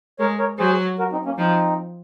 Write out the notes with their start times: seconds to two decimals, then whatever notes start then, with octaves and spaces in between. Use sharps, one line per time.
0.19 G#3 A#4 C#5
0.39 A#4 C#5
0.59 F#3 G#4 C5
0.99 F#4 A#4
1.12 C4 D#4
1.25 A#3 C#4
1.38 F3 C4 D#4